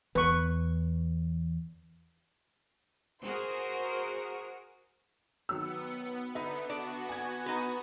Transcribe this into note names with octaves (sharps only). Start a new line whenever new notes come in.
E2 B4 C#6
F#4 G#4 A#4 C5
D#3 F#3 B3 E6 C#7
D3 B3 D#4 B4 E5
B3 D4 F#4 D5
G#5 G#6
D#4 B4